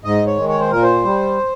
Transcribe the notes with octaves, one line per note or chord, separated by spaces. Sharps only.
G#2 D#5
C#5
D#3 G#3
C#5
C5
A#2 A#4
C5
G3